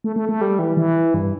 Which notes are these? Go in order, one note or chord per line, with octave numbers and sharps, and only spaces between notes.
A3
A3
A3
G3
E3
E3
G2